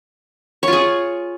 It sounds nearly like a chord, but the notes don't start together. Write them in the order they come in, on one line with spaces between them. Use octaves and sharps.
C#5 F4 G#4